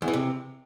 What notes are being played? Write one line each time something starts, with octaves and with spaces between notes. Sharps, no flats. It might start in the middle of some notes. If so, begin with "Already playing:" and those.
E2
E3
C3